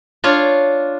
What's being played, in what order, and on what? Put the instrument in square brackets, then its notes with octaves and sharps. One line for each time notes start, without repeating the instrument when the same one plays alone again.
[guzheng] D4 F4 C#5